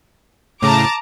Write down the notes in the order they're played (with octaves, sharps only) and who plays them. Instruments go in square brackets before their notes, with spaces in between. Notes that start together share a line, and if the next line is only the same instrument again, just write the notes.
[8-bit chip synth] A2 C#3 [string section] A5 A#5 D6